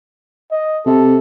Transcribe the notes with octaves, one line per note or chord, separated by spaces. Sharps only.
D#5
C3 A4